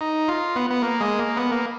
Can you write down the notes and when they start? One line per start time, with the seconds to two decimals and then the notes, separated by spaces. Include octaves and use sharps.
0.01 D#4
0.28 F4
0.56 B3
0.70 B3
0.82 A#3
1.00 G#3
1.19 A#3
1.36 B3
1.51 A#3